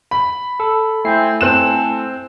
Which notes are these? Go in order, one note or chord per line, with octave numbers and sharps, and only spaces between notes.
B5
A4
A3 C4 E4 C5 G#5 C7
C4 A4 G#5 F#6 E7